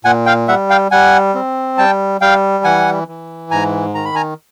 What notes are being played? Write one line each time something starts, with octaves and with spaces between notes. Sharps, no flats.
A#2 F#5 G#5
F5 G5
G3 E5 F#5
F5 G5
G3 F#5 G#5
C4
G3 G5 A5
G3 F5 G5
E3 F#5 G#5
E3
G#2 G#5 A#5
D#3 A#5
B5
G#5 A#5